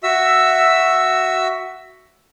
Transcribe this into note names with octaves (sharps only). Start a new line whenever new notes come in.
F#4 E5 E6